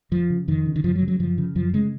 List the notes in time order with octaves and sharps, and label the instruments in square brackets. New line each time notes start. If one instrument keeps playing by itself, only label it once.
[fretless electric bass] F2 F3
C#3
F2 D#3
C#3
D#3
F#2 F3
F#3
C#3
F#3
F#2 F3
C#3
F#2 F3
C#3 G#3